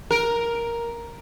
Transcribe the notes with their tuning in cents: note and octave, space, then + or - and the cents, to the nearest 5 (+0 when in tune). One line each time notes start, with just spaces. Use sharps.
A#4 +5